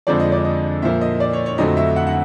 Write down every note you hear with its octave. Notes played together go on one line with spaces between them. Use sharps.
F2 D3 F3 G#3 D5
D#5
D5
D#5
A#2 F3 A#3 E5
D#5
D5
C#5
C#5
F2 D3 F#3 A3 C4 D#5
E5
F#5
F#5